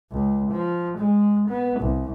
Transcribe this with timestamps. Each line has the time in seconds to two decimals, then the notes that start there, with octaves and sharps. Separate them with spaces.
0.12 C#2
0.51 F3
0.98 G#3
1.49 B3
1.80 C2